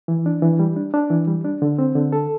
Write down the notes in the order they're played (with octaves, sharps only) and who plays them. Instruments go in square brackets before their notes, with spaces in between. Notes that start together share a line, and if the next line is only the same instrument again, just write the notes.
[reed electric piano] E3
D4
E3
G3
D4
D4
E3
G3
D4
D3
C4
D3
A4